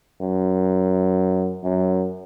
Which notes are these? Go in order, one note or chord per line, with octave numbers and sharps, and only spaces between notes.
F#2
F#2